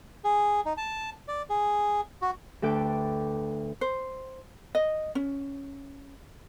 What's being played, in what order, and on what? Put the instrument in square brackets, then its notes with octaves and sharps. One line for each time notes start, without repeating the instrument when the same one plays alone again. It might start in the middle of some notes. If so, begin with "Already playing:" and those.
[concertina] G#4
D#4
A5
D5
G#4
F#4
[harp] D2 A4 B4 G5 D6
[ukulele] C5
D#5
C#4